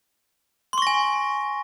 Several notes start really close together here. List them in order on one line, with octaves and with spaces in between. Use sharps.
C6 C#6 A#6 G#5